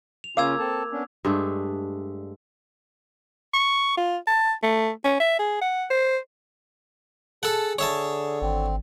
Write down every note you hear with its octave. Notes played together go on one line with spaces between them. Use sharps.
F7
C#3 A#3 C#4 F4 F5 D6 E6 G#6
C4 A4 A5
B3 C#4 D4
G2 G#3 A3 D4
C#6
F4
A5
A3
C#4
E5
G#4
F#5
C5
G#4 A4 F#5 A5
D3 G#4 C#5 E5 A5
G#1 C4